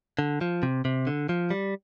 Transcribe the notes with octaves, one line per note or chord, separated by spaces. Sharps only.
D3
F3
C3
C3
D3
F3
G3